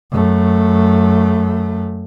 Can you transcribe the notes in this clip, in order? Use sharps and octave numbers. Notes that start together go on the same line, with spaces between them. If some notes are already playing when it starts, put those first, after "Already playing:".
F#2 A3